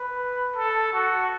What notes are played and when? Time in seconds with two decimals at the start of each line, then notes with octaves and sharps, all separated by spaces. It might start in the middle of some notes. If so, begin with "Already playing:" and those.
Already playing: B4
0.56 A4
0.93 F#4